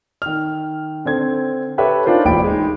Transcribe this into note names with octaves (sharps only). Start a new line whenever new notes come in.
D#3 F6
D3 C4 G#6
G4 A4 B4 C#5 E5
D4 D#4 F4 A#4 C5
E1 A1 G5 B5 D7
G#3 D#4